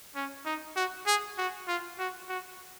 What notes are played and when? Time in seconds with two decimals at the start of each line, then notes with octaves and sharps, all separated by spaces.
0.16 C#4
0.45 D#4
0.76 F#4
1.06 G#4
1.38 F#4
1.68 F4
1.99 F#4
2.29 F#4